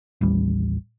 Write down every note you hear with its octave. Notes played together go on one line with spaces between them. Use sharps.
A1 D#2 G3